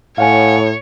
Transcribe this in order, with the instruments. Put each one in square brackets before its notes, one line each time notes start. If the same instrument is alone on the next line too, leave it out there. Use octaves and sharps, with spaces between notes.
[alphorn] A2 [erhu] C#5 [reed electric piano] F5 F#5 G#5